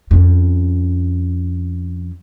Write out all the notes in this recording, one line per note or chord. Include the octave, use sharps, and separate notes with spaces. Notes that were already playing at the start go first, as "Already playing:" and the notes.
F2 C#4